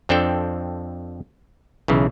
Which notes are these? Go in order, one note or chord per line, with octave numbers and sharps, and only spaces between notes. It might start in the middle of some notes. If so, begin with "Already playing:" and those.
F2 C4 D4 A4 G5
B1 C#3 E3